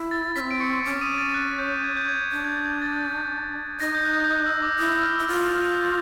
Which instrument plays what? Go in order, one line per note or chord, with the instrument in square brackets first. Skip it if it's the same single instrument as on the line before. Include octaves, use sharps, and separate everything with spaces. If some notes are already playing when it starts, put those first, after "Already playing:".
Already playing: [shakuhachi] E4
[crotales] A6
[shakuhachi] C4 C#4 [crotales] B6
[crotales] D7
C#6 C#7
[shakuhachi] C#4 [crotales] D6 D7
[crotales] D#6 D#7
A6
F#6
G6
G#6
G6
G#6
[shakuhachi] D4 [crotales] G6
[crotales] G#6
G6
G#6
A6
[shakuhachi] D#4 [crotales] A#6
[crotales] G6
F#6
G6
F#6
E6
D6
[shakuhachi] E4 [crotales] D#6
[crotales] F6
[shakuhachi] E4
[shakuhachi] F4 [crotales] F6
[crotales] G6